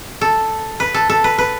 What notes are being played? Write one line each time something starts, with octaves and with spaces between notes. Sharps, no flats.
A4
B4
A4
A4
B4
B4